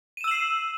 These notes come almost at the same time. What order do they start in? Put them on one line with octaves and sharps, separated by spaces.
D#7 E7 E6 F#7 C7